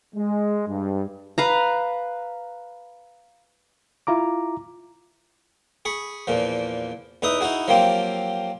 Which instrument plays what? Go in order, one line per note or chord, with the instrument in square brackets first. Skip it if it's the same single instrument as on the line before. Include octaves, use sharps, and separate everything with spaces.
[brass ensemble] G#3
G2
[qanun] B4 F5 A#5
[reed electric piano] E4 F4 A#5 D6
[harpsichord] G#4 B5 C#6
E2 A#2 F3
E2 D#4 B4 E5 D#6
D#4 E4 F#4 G#4
F3 F#3 A#3 C4 F4 G4